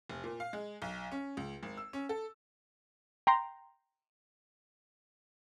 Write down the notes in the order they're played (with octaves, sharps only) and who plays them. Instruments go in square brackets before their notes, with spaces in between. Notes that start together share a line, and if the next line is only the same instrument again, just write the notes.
[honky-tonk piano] F1
A#2
F5
G#3
B1
C#4
C#2
G#1
E6
C#4
A4
[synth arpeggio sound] G5 A#5 C6